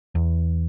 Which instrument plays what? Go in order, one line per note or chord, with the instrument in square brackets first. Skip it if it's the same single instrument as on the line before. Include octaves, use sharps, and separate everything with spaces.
[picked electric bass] E2